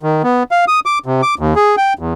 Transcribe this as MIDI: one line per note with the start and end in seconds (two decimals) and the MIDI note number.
0.03 0.22 51
0.24 0.43 59
0.51 0.65 77
0.68 0.80 87
0.86 0.99 86
1.06 1.22 48
1.22 1.35 86
1.39 1.54 39
1.56 1.76 68
1.77 1.94 79
1.99 2.14 40